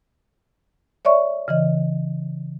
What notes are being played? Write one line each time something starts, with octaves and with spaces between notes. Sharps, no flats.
C#5 D5 E5 C#6
C#3 E3 D#5